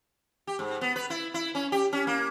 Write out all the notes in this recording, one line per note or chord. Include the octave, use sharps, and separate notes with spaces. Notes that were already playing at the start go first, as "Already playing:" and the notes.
G4
G#2
B3
B4
E4
E4
C#4
G4
C#4
A#3